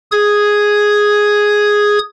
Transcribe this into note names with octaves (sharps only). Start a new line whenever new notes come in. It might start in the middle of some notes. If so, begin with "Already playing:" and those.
G#4 D#6 G#6